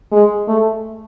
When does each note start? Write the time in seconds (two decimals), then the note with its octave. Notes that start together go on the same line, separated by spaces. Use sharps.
0.12 G#3
0.48 A3